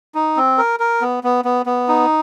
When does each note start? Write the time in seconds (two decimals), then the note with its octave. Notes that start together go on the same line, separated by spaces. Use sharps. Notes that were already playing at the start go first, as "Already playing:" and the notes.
0.15 D#4
0.37 C4
0.58 A#4
0.80 A#4
1.01 B3
1.24 B3
1.45 B3
1.66 B3
1.88 D#4